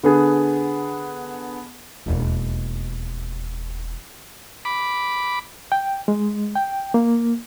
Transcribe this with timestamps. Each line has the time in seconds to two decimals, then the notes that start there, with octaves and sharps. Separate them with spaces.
0.03 D3 B3 G#4
2.06 E1 D#2
4.65 B5 D6
5.72 G5
6.08 G#3
6.56 G5
6.94 A#3